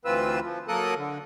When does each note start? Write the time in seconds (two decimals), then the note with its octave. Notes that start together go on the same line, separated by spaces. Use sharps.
0.05 D2 E3 C4 F4 B4 E6
0.43 F3
0.68 F#3 A#3 A4 A#4 D#6 F#6
0.97 D3